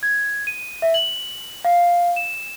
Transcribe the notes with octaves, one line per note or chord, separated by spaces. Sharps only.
G#6
D#7
E5
F#7
F5
E7